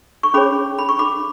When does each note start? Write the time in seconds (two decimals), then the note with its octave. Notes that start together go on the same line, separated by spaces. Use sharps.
0.23 C#6
0.34 C#4 G#4 C#5 B5 D6
0.78 B5
0.89 C#6
0.99 B5 D6